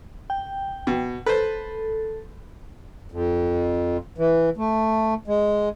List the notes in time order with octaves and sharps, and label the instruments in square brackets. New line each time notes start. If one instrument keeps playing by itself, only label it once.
[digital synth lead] G5
[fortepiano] B2
[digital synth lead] A4 [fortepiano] B4 C5
[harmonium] F2
E3
A3
G#3